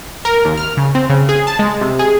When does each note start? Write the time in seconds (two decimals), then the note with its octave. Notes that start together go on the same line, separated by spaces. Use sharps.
0.25 A#4
0.45 D#2
0.57 F6
0.77 C#3
0.95 C4
1.10 C#3
1.29 G#4
1.47 A5
1.59 G#3
1.81 C3
1.99 G#4